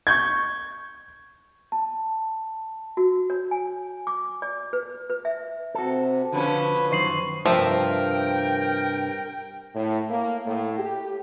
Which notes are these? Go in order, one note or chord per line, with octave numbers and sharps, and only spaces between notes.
C#6 G6 G#6
A5
F#4
C#5
G#5
D6
D5
B4
B4
E5
C3 F#4 A4
B2 D3 F3 C#4 B4
F#2 D#3 C5 C#6 C7 F#7
G2 C3 F3 A#4 E5 G5
A2
A#3
A2
G4